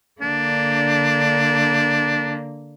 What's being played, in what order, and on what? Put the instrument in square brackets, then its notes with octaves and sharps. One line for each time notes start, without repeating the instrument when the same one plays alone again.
[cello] D3 A#3 [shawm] D4